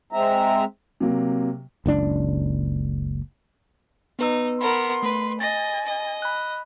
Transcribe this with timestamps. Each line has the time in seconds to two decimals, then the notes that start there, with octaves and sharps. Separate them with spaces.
0.13 G#3 C4 E5 A#5
1.00 C3 F#3 A#3
1.86 F#1 C#2 D4
4.19 B3 D#4 B4 E6
4.61 B3 A#4 B5 C6
5.03 A3 B4
5.40 D#5 G#5 A6 A#6
5.86 D#5
6.22 B5 F#6